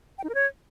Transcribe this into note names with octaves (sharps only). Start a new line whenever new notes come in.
G5
D#4
A#4
C#5